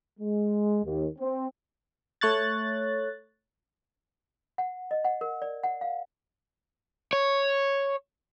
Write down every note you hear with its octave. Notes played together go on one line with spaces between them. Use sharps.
G#3
D#2
C4
A3 C#5 F#6 A6
F#5
D#5
F#5
A#4
D5
F#5
F5
C#5